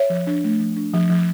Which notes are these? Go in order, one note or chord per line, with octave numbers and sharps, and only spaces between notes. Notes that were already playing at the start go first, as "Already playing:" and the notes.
Already playing: C#5 E5
F3
D4
A3
F3
D4
F3
F3